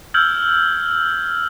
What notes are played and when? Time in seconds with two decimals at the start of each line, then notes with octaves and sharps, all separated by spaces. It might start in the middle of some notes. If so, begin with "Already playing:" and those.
0.14 E6 F6 G6 G#6 F#7